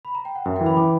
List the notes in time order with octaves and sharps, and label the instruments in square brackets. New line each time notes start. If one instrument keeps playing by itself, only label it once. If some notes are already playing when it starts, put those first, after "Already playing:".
[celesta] B5
A#5
G5
F#5
[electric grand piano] F#2 [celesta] E5
[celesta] G5
[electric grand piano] E3
[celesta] B5
[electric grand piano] E3 [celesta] D6